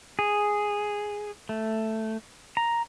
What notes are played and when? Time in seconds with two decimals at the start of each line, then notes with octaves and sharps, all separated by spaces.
0.19 G#4
1.49 A3
2.57 A#5